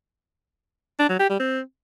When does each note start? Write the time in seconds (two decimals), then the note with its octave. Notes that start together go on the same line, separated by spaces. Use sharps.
0.99 D4
1.09 F#3
1.20 G4
1.30 G3
1.40 C4